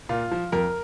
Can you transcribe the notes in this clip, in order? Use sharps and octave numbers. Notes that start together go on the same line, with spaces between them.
A#2 F4
F3
F2 A#4